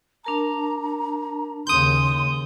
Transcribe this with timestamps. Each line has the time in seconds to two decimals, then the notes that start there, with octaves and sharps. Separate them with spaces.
0.25 D4 A#4 A5 A#5
1.67 D#2 C#3 C6 D#6 G6